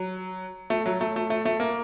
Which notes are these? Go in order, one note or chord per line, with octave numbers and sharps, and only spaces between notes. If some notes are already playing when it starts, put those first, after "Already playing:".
Already playing: F#3
A3
F#3
A3
A3
A3
A3
A#3